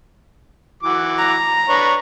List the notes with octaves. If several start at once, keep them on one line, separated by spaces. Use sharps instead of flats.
E3 F#4 D6
A#5
D4 B4 C#5